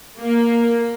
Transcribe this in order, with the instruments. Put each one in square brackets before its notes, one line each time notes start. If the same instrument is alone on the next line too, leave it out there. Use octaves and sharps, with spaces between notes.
[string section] A#3